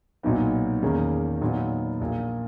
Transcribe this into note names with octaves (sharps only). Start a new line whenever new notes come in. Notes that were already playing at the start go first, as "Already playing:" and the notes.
B1 A#2 F#3 B3 D#4
E2 D#3 A#3 C#4 G#4
A#2 F#3 B3 D#4 F#4
A#1 A#2 A#3